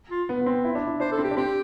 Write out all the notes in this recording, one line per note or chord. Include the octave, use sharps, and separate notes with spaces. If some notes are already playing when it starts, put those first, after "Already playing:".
F4
B3
B3
C4
E4
D4
E4
D4 C5
A4
C4
G4
D4
C4 G4